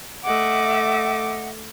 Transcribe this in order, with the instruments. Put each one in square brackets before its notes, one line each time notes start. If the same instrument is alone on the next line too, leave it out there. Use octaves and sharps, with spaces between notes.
[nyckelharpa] A3 D6 [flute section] D#5 E5 F#5